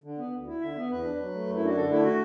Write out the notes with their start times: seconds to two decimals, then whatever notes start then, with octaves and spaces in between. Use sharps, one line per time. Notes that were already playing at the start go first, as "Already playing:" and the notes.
0.04 D3
0.18 B3
0.33 D2
0.47 E4
0.61 D3 E5
0.76 B3
0.90 E2 B4
1.04 D4
1.19 F#3
1.34 A3
1.47 F#2
1.56 E4
1.62 D4 F#4
1.76 D3 A4
1.90 A3 E4
2.04 F#4